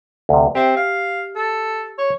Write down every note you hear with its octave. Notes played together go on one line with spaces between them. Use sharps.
D2 C3
C4 G4 E5
F5
A4
C#5